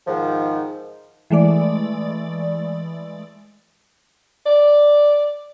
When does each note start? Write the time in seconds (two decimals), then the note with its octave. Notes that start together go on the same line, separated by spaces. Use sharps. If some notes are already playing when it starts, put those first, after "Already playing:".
0.07 G#2 D#3 F3
1.30 E3 G#3 A3 D5
4.46 D5